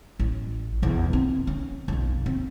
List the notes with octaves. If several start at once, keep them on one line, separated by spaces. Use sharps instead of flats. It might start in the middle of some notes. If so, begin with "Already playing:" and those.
A1
B1 E2
C4
C#4
B1 F2
C4